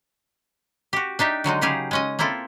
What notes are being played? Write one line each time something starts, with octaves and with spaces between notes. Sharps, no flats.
F#4 G4
D4 D#4 G4 E5
D3 F#3 G#3 D#4
C#3 F#3 G4 G#4 F5
G#3 C#4 D#5
A#3 C4 E4 F4 A4